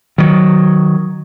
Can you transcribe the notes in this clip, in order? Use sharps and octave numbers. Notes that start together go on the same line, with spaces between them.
D#3 F#3